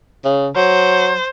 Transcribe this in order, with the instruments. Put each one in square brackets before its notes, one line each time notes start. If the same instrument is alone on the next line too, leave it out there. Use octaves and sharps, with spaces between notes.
[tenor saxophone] C#3
[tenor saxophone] F#3 [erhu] C5